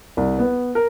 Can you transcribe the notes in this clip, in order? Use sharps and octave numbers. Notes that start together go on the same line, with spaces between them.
C2
B3
A#4